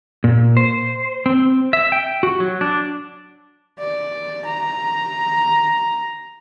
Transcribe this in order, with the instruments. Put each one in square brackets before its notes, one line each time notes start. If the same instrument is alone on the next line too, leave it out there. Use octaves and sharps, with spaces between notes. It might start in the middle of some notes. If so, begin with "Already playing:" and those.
[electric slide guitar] A#2
C5
C4
E5
G5
F#4
F#3
D4
[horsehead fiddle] D5
A#5